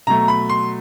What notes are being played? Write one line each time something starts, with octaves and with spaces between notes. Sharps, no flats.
B2 F#3 A3 A#5
B5
C6